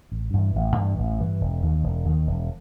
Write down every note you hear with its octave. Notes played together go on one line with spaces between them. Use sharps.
A1
G2 E3
A1
G2 E3
A1
G2 E3
E1
D#2 D#3
E1
D#2 D#3
E1